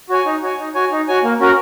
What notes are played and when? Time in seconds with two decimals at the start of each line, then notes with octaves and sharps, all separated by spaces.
0.10 F#4 C#5 G#5
0.26 D#4
0.42 F#4 C#5 G#5
0.59 D#4
0.75 F#4 C#5 G#5
0.91 D#4
1.08 F#4 C#5 G#5
1.24 A#3
1.40 C#4 F#4 A#4